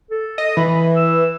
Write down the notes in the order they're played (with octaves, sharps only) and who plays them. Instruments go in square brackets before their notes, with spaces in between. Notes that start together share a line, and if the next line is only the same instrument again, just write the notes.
[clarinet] A4
[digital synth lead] D#5
[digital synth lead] E3 [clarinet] B5
[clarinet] E6